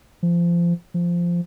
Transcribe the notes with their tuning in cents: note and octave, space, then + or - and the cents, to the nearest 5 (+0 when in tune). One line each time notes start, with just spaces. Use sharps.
F3 -25
F3 -10